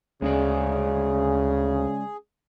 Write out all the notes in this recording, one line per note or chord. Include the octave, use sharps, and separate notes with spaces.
D2 C#3 G#3 C#4 G#4 D5